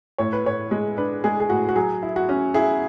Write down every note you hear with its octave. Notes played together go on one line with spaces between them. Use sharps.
A2 C#5
B4
A2 C#5
G#3
D4 B4
G#3 G#4
G#4
A2 F#4
F#4
F#3 G#4
E4
F#4
C#4
E4 G#4